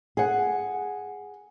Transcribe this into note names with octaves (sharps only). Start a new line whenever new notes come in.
G#4 F#5